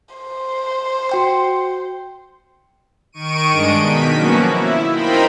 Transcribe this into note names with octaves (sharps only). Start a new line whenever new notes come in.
C5
F#4 G5 C6
D#3 C#6 D7 D#7
G2 G#3 D4 D#5 D7
B2 D#3 B6
F3 F#3 A#3 B3 C#4 F#4
E4
D#4 F4 A#4 C5 G5 B5